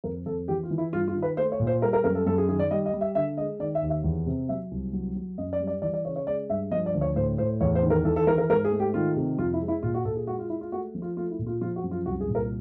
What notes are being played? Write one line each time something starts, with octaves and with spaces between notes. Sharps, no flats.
F2 A#4
F2 A4
E3 G4
F4
E3
E4
G2 F4
F4
D#3
B4
A3 C5
C#5
A#2
C5
G3 A#4
A#4
F#2 A#4
A4
F#2 A4
G#4
D#3 G#4
D5
G3 D#5
D#5
G3
E5
D3 E5
G#3 D#5
D#3 D5
E5
D#2
E5
E2
C3
F#3 E5
C2
F#3
F#3
F#2 D#5
D5
G3
D5
E3 D5
D5
C#3 C#5
C#5
G#3 D5
G2 E5
F3 D#5
D5
D2
C#5
A2 C5
A2 C5
E2 C#5
C5
D#3
A#4
E3 A4
A4
E3 A#4
A#4
G#2 A#4
G#4
A3
G4
D#3 F4
C3
F2 F4
E4
G#3
E4
A#2 F4
F#4
A#2 A4
G#4
G#3 F#4
F4
G#3 E4
F4
A3 F#4
F3
F4
A3 F4
E4
A#2
F4
F3 F4
F#4
F#2
F4
C2 F#4
G#4
A#2
A#4